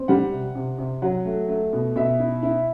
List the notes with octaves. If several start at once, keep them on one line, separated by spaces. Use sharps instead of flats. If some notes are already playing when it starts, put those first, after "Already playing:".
Already playing: C4
G3 F#5
C3
C3
C3
F#3 F#5
A3
A3
B2
B2 E5
E4
E4